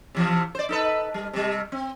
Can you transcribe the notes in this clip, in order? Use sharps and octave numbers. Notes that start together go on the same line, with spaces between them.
C3 E3 F3
C5 D5
D#4 A4 B4
G3
C3 G3
C4